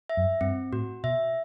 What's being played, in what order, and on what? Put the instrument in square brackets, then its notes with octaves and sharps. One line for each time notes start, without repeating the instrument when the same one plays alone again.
[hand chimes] E5
[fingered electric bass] F#2
[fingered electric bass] G2 [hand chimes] C4
[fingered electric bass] A2 [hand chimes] F#4
[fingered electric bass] B2 [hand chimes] E5